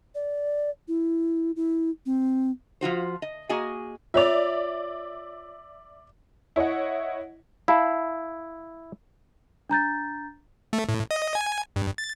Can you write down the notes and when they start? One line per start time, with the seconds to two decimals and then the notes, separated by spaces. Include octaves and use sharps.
0.15 D5
0.88 E4
1.56 E4
2.06 C4
2.81 F3 F4 F#4 C5
3.22 D#5
3.49 A#3 F#4 G#4 D#5 G#5
4.14 F4 C#5 D5 E5 F7
6.56 E4 C#5 D#5 F#5
7.68 E4 F5 A5 B5
9.70 D4 A#5 G6 A6
10.73 A3
10.89 A2
11.11 D#5
11.35 G#5
11.76 G2
11.98 A6